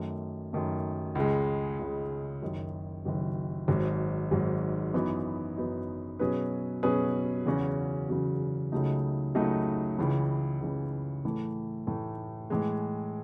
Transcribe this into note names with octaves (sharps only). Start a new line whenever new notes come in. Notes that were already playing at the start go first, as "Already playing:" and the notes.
Already playing: F#2 D#3 A3
F#2 D#3 A3
C#2 C#3 G#3
C#2 C#3 G#3
F#1 F#2 D#3 F#3
F#1 F#2 D#3 F#3
G#1 G#2 F#3
G#1 G#2 F#3
F#2 E3 B3 D#4 F#4
F#2 E3 B3 D#4 F#4
B2 F#3 C#4 G#4 B4
B2 F#3 C#4 G#4 B4
E2 C#3 F#3 C#4 F#4
E2 C#3 F#3 C#4 F#4
C#2 C#3 F#3 A3 D#4
C#2 C#3 F#3 A3 D#4
C#2 C#3 E3
C#2 C#3 E3
A2 E3 A3
A2 E3 A3
A2 E3 G#3